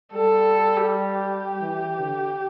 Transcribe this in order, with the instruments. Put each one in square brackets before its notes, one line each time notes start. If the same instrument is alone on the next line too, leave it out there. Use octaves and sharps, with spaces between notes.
[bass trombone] G3 [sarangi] A4
[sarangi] G4
[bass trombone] E3
D3